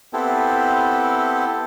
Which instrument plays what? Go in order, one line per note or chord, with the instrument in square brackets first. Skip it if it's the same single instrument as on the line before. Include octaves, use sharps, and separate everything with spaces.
[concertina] B3 C4 E4 G4 A4